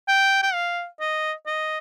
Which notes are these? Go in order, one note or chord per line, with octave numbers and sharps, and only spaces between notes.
G5
G5
F5
D#5
D#5